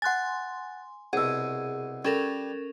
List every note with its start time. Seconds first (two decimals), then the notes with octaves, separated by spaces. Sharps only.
0.02 F#5 G#5 C6 F#6 A6
1.13 C2 B2 G#4 F#5 E6
2.05 G3 C#4 A4 A#4